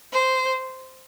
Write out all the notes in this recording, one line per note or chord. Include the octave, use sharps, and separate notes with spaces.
C5